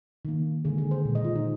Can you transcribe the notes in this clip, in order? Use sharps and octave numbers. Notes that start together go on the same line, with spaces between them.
D#3 A#3
D3 G#3 G#4
G#4
C5
A#2 G#3
D#5
F4
D#4